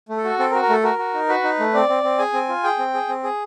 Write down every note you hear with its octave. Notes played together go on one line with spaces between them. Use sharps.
A3
A4
F#4
C4 A4
A#4
F#4
A#4
A3 A4
F#4 A#4
F#4
D#4
F#4 B4
D#4
A3
C4 D5
C4
C4
G#4 G#5
C4
F4
G#4 G5
C4
G#4
C4
G#4